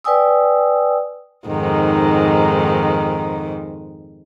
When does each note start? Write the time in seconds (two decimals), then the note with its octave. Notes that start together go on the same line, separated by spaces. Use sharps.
0.04 B4 D5 G5 G#5 D#6 E6
1.47 F2 G#2 D#3